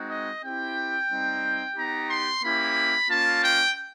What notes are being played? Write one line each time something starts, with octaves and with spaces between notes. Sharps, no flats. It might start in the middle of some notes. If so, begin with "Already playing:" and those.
Already playing: G#3 C4 D#4 F#4
D#5
C4 E4 G4 G5
G3 C4 D#4
B3 D#4 G4 A#5
C6
A#3 C#4 E4 G4 B5
A#3 C#4 F4 A5
G5